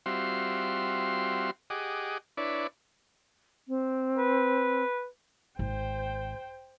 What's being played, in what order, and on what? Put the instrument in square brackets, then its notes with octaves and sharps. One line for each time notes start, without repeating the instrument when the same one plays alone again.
[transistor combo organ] G3 C4 F4 F#4 E5 C6
G4 G#4 D#5 F#5 D6
D4 E4 B4 C#5 D5
[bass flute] C4
[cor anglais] B4
[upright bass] G#1 [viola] C5 G5